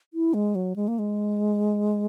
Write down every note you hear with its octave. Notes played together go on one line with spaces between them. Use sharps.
E4
G#3
F#3
G#3
A#3
G#3